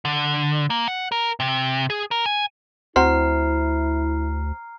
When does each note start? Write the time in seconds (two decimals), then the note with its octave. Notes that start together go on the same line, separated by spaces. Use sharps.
0.05 D3
0.70 A#3
0.88 F#5
1.12 A#4
1.40 C3
1.90 G#4
2.11 A#4
2.26 G#5
2.96 D2 C4 E4 F#4 C5 A#5 F6 C7